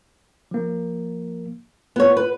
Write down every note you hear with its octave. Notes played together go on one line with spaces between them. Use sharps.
F3 A#3
B3 F4 C#5
B4